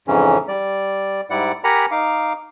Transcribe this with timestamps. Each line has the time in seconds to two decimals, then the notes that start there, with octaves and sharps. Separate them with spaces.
0.08 F2 G#2 C#3 E3 C#4
0.48 G3 D5
1.30 G#2 G3 E4 D5 F#5
1.64 G4 A#4 F#5 G#5 A#5 B5
1.91 D#4 F5 D6